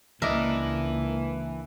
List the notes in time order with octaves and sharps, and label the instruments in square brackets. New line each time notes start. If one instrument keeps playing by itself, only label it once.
[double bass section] C#2 A#3 [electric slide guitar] E3 E4 [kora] D4 D#5 [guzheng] A#4 E5